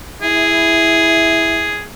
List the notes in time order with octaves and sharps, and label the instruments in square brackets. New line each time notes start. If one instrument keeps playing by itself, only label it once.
[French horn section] E4 [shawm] G#4